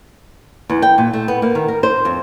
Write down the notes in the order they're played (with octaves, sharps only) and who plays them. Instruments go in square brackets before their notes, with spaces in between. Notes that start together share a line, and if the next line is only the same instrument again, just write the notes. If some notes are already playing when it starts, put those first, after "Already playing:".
[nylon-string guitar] E2
G5
A#2
A3
B3
A#3
D#3
A#4
C5
F2